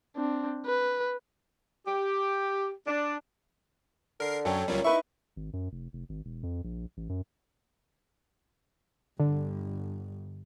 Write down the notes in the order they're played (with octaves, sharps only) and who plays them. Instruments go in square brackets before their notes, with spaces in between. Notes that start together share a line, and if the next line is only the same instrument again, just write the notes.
[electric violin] C4 D4
B4
[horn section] G4
D4
[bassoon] D3 [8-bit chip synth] A#4 C7
[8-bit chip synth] F#2 F#3 [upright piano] A4 C#5 G5
[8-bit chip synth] C#2 F#3 G3 [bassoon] A#2 [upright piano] C#4
[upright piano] D#4 B4 E5 [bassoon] E4 [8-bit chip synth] C#6
[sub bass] G#1
F#2
F1
F1
G#1
E1
F2
A#1
A1
F#2
[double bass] G1 [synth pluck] D3